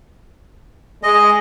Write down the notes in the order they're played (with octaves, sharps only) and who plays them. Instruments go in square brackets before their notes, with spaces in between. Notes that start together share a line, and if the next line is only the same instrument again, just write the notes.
[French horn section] G#3 [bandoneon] D#5